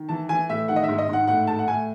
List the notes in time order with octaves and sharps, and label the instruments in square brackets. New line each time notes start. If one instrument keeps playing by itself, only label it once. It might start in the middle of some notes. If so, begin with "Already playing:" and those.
Already playing: [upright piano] D#3
E3 A5
E3 G#5
A2 E5
D#3 F#5
D#5
E5
G#2
D#5
G#2 F#5
A2 F#5
A2 A5
F#5
A2 G#5